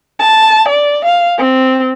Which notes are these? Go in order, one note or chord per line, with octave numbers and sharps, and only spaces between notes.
A5
D5
F5
C4